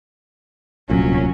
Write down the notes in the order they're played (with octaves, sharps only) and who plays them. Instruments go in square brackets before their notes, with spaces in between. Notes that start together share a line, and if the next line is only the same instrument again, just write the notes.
[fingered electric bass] D1 C2 A#2 [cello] F#3 C#4